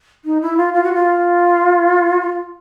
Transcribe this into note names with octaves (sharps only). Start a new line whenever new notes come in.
D#4
E4
F4
F4
F#4
F4
F4